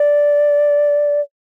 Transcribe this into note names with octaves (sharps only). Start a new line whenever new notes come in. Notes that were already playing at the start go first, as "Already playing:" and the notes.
Already playing: D5